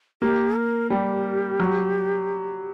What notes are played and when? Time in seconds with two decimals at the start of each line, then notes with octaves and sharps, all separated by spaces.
0.22 A#3 G4
0.56 A#4
0.90 G3 G4
1.59 F#3